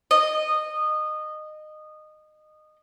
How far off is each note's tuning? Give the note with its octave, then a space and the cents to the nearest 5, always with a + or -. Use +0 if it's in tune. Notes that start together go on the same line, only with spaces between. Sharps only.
D#5 -20